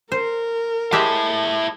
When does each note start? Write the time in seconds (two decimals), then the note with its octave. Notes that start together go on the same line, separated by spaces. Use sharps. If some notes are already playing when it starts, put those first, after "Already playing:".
0.12 A#4 C5
0.93 G#3 E4 G4 E5 A5